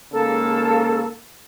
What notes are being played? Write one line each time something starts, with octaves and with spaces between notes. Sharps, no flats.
G#2 C#3 A#3 A4